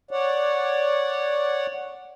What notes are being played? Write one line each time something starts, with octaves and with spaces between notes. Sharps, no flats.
C#5 D5 F#5